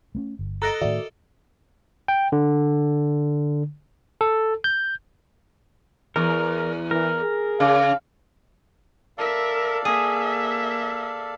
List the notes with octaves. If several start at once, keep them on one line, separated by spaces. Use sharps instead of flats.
A3 A#3 C#4
G1
A4 A#4 D#5 A#5 F#6 A#6
A2 D#3 F#4 D5 E5
G5
D3
A4
G6
E2 A#4
E3 A#4
G#4
C#3 F5
A4 A#4 D5 E5 F5
A#3 G#4 E5